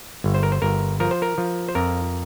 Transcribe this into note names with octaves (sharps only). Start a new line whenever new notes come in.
G1
C5
A#4
C5
G1 A#4
F3 A#4
C5
A#4
F3
C5
F2 A#4